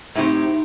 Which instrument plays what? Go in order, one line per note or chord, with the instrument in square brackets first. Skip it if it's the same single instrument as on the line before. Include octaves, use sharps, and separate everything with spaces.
[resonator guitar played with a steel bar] A2 A3 C4 G4 [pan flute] D#4